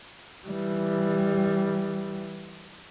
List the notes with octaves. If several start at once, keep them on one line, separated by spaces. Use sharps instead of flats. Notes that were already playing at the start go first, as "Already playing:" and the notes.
E3 G3